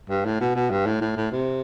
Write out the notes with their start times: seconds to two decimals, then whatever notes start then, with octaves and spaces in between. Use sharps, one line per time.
0.10 G2
0.25 A2
0.41 B2
0.55 B2
0.71 G2
0.86 A2
1.01 A2
1.16 A2
1.32 C3